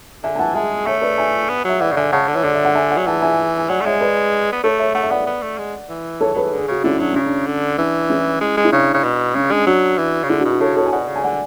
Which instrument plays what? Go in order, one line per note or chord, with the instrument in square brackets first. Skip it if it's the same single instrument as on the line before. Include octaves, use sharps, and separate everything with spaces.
[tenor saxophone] D3 [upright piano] E5 G#5
[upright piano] G#5
[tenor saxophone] E3 [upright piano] F#5 A5
[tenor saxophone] G#3 [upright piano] E5 G#5
[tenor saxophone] A3 [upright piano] C#5 E5
[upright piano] B4 D5
E5 G#5
[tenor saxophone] B3
[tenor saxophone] F#3 [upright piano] E5
[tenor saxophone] E3 [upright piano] D5 F#5
[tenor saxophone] C#3
[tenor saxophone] D3 [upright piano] E5 G#5
[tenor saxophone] C#3 [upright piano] F#5 A5
[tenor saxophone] D3
[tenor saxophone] E3 [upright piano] C#5
[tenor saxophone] D3 [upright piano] D5
[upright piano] E5
F#5
E5 G#5
D5 F#5
[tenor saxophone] F#3
[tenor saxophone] E3 [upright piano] F#5 A5
[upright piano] E5 G#5
G#5
[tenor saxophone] F#3 [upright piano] D5 F#5
[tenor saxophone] A3
[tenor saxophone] G#3 [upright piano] C#5 E5
[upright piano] B4 D5
[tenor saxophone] B3
[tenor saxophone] A3 [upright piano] A4 C#5
[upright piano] C#5 E5
[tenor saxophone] A3 [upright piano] F#5
[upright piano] E5
[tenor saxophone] B3 [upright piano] D5 F#5
[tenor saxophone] B3
A3
G#3
E3
[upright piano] A4 C#5
[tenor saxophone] F#3 [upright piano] G#4 B4
[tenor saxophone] E3
D3
[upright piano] G#4
[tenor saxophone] C#3 [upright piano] F#4
[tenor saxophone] D3 [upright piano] C#4 E4
[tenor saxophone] F#3 [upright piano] D4
[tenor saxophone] C#3 [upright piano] C#4
[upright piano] D4
[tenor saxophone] D3
[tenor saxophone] E3 [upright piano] D4
[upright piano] C#4 E4
[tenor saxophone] G#3
G#3
[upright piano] E4
[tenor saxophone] C#3 [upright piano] D4
[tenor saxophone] C#3
B2
[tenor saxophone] C#3 [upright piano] C#4
[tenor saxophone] G#3 [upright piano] D4
[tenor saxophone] F#3 [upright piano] D4 F#4
[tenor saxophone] E3
C#3
[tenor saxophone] D3 [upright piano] E4 G#4
[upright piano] D4 F#4
[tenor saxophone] B2
[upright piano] D4 F#4
[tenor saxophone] C#3 [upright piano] A4 C#5
[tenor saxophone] B2 [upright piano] A4 C#5
[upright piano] G#5
[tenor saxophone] B2 [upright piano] D5 F#5
[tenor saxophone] C#3
[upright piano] G#5
[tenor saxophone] D3 [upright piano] D5 F#5